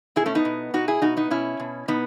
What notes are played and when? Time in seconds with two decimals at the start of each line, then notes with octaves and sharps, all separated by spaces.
0.16 B2 E4 G#4
0.26 A3 C#4
0.35 B3 D#4
0.45 B2
0.74 B2 D#4 F#4
0.88 E4 G#4
1.02 B2 D#4 F#4
1.17 B3 D#4
1.31 B2 C#4 E4
1.60 B2
1.88 B2 B3 D#4